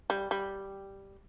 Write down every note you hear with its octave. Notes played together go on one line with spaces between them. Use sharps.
G3
G3